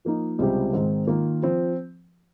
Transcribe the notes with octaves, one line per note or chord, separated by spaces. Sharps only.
F3 A#3 D#4
C#2 C3 G3 C4 G4
G#2 D#3 G#3 C4
D#3 A#3 F4
F3 C4